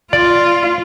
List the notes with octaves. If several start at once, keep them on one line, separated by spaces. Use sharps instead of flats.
F4 D5